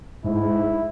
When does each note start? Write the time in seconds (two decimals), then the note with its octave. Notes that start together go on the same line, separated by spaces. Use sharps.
0.24 G#2 E4